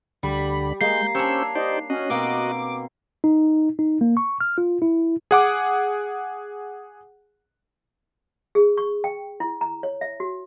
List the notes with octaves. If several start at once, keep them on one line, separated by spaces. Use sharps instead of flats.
D2 D3 G3 B5
G#3 A#3 G6 C7
C#4 D4 G4 C5 C#5 E6
D#4 G4 C5 D5
C#4 F#4 D#5
B2 A#3 C4 D6
D#4
D#4
A#3
C#6
F6
F4
E4
G#4 F#5 D6
G#4
C#6
G5
E4
A#5
C#5
E5
F#4